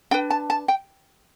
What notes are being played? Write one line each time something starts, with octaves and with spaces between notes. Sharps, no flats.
D4 B4 G5
A5
A5
G5